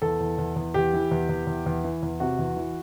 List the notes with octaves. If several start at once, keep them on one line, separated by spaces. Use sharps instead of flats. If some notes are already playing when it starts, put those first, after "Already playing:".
E2 A4
E2
E2
E2
E2 G4
E3
E2
E2
E2
E2
E3
E2
C3 F#4
E2
E3